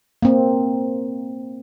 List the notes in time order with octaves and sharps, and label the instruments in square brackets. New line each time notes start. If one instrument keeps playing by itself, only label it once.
[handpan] A#3 C4